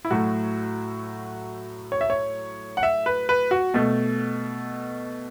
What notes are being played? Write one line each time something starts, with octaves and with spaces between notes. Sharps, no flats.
E4
A2 F#3 A3 F#4
C#5
E5
C#5
F#5
E5
B4
B4
F#4
B2 A3